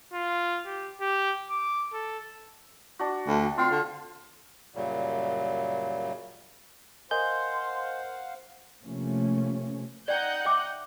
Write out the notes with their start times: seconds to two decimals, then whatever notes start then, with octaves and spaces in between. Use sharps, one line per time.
0.13 F4
0.66 G4
1.00 G4
1.50 D6
1.93 A4
2.99 D4 F#4
3.28 D2
3.58 C4 F4 F5
3.71 D3
4.75 F#2 A#2 C#3 F#3 G3
7.11 A#4 C5 D#5 F5 F#5 G#5 C6 G6
8.83 C3 F3 A3 A#3 C#4
10.08 D#4 D5 F#5 G5 G6
10.45 E5 G5 D6